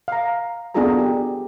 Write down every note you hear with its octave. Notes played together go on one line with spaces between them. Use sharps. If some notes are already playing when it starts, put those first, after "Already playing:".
F5 A#5
B3 D4 F4 G#4 A4 A#5
G4